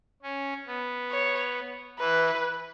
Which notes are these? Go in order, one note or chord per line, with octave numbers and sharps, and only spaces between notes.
C#4
B3
C#5
E3 B4